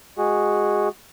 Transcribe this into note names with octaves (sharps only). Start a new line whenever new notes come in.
G#3 F#4 G#4